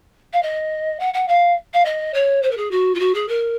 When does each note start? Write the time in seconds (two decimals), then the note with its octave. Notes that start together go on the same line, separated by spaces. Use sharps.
0.33 F5
0.42 D#5
1.00 F#5
1.14 F#5
1.28 F5
1.73 F5
1.85 D#5
2.14 C#5
2.42 C5
2.51 A#4
2.57 G#4
2.71 F#4
2.95 F4
2.99 F#4
3.14 G#4
3.28 A#4